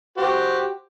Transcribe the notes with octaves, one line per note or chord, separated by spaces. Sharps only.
F#4 G4 C5